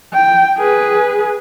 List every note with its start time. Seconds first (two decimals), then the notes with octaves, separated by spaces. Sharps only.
0.14 G5
0.58 G#4 B4